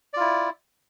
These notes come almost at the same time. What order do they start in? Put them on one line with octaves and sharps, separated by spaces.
D5 F4 E4